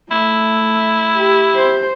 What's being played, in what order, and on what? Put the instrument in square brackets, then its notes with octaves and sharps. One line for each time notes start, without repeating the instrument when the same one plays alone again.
[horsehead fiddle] A3 [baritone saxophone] E4
[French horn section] G4
[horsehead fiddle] C5